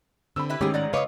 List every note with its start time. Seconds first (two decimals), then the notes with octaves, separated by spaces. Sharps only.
0.36 D3 C4 B5 E6
0.50 E4 G4 B4
0.61 A1 G#2 D#3 C#4 G4 G#4
0.74 D5 F#5 A#5
0.93 C#3 F4 B4 C#5 D#5 F5 D6 D#6